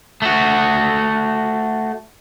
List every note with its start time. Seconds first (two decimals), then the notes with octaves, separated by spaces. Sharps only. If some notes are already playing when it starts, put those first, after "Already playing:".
0.22 A3 F#4